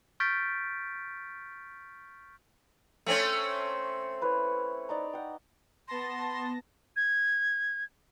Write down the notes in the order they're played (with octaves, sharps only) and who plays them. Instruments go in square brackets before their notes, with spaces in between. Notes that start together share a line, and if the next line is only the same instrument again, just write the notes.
[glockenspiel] C#6 F6 G6 A6 B6 D7
[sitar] A3 C4 C#4
[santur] E4 B4 C#5
D#4 D5 A#5
F#5 G5
[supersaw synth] B3 A5 A#6 [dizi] C6
[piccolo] G#6